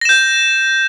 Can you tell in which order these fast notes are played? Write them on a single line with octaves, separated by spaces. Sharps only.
A#6 E7 G6